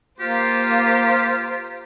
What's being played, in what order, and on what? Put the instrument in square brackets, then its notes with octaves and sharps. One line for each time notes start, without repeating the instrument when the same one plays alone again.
[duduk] A#3 [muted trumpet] F4 [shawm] G4 [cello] C5